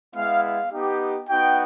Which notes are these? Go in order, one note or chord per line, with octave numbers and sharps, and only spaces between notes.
G#3 B3 E4 F5
F5
B3 D#4 G4
B3 D#4 F#4 G5